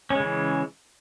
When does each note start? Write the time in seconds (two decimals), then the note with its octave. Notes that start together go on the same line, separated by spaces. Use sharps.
0.10 C#4
0.15 G#3
0.20 C#3
0.24 E3